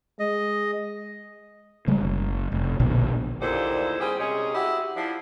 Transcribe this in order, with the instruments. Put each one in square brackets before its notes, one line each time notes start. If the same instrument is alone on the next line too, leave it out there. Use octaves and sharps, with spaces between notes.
[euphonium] G#3 [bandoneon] D#5
[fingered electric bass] C#3 G3 G#3
F#1
F1
A#1 B2 D3
[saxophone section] D#2 A#2 D3 E4 C5
G3 C4 G4 G#4
C3 G#3 C#4 G#4
E4 F#4 G4
F3 D4 E4